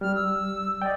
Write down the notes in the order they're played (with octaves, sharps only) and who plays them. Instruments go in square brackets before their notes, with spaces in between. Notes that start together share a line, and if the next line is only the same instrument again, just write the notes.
[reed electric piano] G3 [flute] F6
[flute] E6
[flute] D5 [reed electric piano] D#5 G5